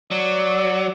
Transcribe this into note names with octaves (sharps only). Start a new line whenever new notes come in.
F#3 D5